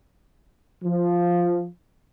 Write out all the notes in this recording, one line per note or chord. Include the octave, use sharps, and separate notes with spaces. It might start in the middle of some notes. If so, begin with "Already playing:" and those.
F3